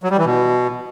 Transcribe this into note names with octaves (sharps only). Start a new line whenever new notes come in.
F#3
G3
E3
B2